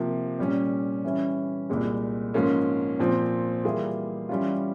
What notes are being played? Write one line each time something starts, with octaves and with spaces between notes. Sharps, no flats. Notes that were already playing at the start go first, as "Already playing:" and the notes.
Already playing: C3 F3 A#3
A#2 G3 C#4
E3 G3 C#4
C2 A#2 G#3
G#2 F3 A#3 C#4
A#2 F3 C4
E3 G3 A#3 F4 G#4
E3 G3 C#4 F4